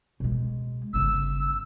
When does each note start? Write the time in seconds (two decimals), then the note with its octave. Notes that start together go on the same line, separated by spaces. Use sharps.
0.20 B2 G#3
0.93 G1 C#3 E6